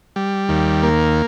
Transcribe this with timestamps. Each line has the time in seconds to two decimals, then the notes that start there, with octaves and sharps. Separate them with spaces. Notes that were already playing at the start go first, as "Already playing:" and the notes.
0.16 G3
0.49 D#2
0.83 A#3